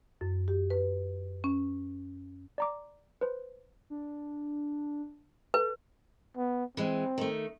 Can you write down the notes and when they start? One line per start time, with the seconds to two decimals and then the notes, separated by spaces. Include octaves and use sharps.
0.21 F#2
0.48 G4
0.70 B4
1.44 C#4
2.58 D5 A#5 D6
3.21 B4 C5
3.90 D4
5.54 A4 B4
6.37 B3
6.77 E3 G#3 C4
7.18 D#3 A3